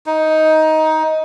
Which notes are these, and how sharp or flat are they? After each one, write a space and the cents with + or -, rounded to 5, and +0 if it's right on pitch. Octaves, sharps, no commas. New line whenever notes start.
D#4 +15